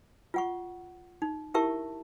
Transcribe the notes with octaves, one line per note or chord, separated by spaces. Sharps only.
F4 F#5 C#6
D#4
E4 G4 A#4 E5 A5 C#6